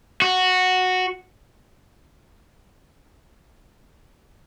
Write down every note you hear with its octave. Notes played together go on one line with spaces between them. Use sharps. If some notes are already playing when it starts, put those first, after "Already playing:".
F#4